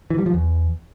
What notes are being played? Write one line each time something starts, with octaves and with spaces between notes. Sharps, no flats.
E3
G3
F3
E2